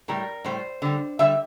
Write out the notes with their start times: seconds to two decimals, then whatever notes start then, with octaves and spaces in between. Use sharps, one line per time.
0.08 A2 G3 A#4
0.45 A2 G3 C5
0.82 D3 G3
1.19 D3 G3 E5